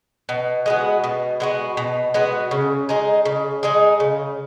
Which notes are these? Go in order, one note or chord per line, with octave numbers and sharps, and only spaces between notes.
B2
G#3 B3 F#4
B2
G#3 B3 F#4
B2
G#3 B3 F#4
C#3
G#3 D#4 G#4
C#3
G#3 D#4 G#4
C#3